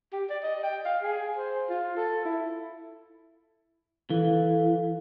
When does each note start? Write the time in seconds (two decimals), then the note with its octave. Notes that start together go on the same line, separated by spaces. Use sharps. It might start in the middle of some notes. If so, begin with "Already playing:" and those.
0.13 G4
0.30 D5
0.43 D#5
0.63 G5
0.85 F5
1.02 G#4
1.37 C5
1.69 F4
1.97 A4
2.25 E4
4.10 E3 A4 F5